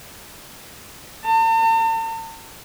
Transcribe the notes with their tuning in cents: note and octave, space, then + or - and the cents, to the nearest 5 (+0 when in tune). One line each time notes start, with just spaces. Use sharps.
A5 +45